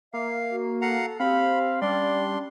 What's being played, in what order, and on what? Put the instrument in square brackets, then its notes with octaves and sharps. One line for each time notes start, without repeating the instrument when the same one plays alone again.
[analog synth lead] A#3 [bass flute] E5 [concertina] F5
[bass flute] F#4
[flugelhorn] A4 [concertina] F5 F#5 A#5
[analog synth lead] C4 [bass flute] G4 [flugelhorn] F5 [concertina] B5
[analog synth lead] G3 [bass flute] C#4 [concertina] D4 C6 [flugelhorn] D5